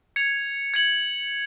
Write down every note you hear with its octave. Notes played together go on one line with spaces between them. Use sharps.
G#6 C#7 F7
G#6 C#7 F#7